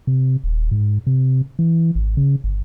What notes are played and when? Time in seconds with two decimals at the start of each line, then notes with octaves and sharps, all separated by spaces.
0.07 C3
0.44 D#1
0.71 G#2
1.07 C3
1.59 E3
1.95 G#1
2.17 C#3
2.44 G1